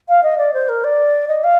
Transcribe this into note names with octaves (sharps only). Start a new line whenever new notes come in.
F5
D#5
D5
C5
A#4
D5
D#5
F5